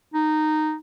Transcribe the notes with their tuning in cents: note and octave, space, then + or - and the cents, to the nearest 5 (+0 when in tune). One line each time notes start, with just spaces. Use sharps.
D#4 -10